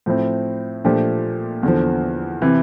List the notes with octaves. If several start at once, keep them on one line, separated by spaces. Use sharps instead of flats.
A2 F3 C4
A#2 F3 A3 D4 G4
E2 D3 F3
C3 E3